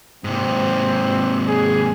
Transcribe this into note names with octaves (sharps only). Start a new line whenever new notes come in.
G#2 C3 C4
G#4